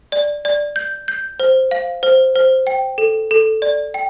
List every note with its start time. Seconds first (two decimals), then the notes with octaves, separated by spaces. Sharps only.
0.12 D5
0.45 D5
0.76 G6
1.08 G6
1.40 C5
1.71 F5
2.03 C5
2.36 C5
2.67 G5
2.98 A4
3.31 A4
3.62 D5
3.94 G5